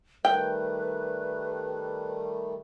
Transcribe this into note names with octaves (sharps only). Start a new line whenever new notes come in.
D#3 G3 A3 B4 G5